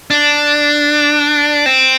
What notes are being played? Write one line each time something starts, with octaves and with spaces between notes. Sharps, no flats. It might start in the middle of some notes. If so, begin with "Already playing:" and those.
D4
C4